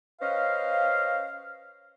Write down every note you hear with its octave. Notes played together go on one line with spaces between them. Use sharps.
C#4 B4 C5 D#5 F5